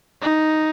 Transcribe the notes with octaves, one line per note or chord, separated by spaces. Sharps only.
D#4